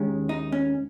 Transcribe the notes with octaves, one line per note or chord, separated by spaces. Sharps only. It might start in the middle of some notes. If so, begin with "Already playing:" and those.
Already playing: D#2 D#3 G#3 C#4
D#4
C#4